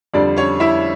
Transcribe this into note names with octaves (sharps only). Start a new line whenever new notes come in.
F2 D3 G3 D4 D5
C#4 C#5
E4 E5